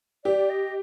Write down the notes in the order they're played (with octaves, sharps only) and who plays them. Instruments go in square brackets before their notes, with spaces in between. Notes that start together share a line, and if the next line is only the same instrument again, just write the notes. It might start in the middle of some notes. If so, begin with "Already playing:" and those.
[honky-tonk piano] G4 [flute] D5
[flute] D#5